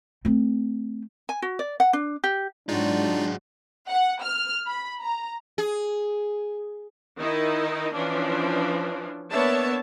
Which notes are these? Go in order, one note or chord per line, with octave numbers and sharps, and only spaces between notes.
A3 C4
G#5
F#4
D5
F#5
D4
G4
G#2 F#3 G#3 D4 D#4 F4 F#4 D5
F#5
F6
B5
A#5
G#4
D#3 D#4 E4 D#5
E3 F3 C#4 D4
A#3 B3 D4 C#5 E5 A5